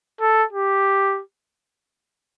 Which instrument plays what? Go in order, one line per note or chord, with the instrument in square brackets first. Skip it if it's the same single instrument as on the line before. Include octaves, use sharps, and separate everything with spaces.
[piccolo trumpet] A4
G4